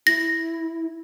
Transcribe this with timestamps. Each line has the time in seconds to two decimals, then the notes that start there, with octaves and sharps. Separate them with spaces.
0.07 E4 A#6